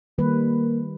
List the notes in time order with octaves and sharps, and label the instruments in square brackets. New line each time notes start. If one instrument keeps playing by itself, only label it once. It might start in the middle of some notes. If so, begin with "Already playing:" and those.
[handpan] D#3 G3 B4 [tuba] A#3